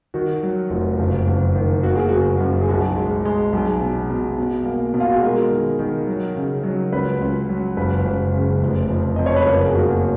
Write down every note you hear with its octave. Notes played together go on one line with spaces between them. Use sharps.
D#3 F#4
F#3
F1
F#1
F#1
D#3
A#3 F#4
G#4
F#1 F#4
F#4
F#2
G#4
B1 F#4
G#3
G#3
B1 G#4
B2
B2
B2
A#3
B2
F4
F#4
G#4
G#3 A#4
D#3
D#3
F#3
C#3
F#3
C#2 B4
C#2
F#3
F#1 B4
F#1
C#3
F1
F2
F2 D#5
C#5
B4
F#1 A#4
G#4
A#3 F#4